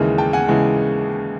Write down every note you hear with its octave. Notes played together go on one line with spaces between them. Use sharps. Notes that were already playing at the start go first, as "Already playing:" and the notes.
Already playing: D#2 C#3 E3 G#3
G5 A5
F#5 G#5
C#3 E3 G#3